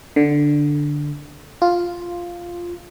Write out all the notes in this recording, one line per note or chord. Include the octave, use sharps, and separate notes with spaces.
D3
F4